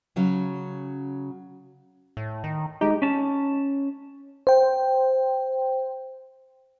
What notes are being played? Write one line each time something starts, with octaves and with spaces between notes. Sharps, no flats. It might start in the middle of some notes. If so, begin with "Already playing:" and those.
C#3 F#3 C#4
A2
D#3
G#3 D#4 G4
C#4 A5
C5 G5